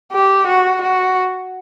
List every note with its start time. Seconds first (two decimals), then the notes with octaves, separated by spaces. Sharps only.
0.12 G4
0.47 F#4
0.82 F#4